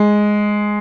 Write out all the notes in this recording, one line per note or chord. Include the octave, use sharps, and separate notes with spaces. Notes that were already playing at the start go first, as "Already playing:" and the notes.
Already playing: G#3